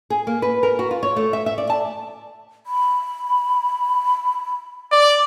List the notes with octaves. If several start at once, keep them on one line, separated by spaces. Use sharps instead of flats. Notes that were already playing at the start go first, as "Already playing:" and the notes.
G#4
A#3
B4
A#4
F#4
F4
C#5
A3
E5
E5
D5
A5
B5
D5